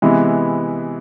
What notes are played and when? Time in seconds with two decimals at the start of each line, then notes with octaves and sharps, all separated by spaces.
0.02 C3 E3 G#3 B3 E4